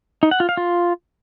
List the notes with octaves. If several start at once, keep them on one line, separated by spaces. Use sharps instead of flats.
D#4
F#5
F4
F5
F4